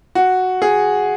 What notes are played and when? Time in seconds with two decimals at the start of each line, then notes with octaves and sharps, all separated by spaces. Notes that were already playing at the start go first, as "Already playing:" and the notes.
0.15 F#4
0.62 G#4